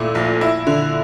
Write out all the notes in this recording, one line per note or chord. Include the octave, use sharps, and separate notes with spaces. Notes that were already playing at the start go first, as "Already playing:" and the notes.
Already playing: A#2 A3 E4
A#1
E4
D3